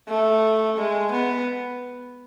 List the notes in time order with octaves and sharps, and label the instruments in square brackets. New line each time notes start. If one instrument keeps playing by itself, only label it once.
[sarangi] A3
G#3
B3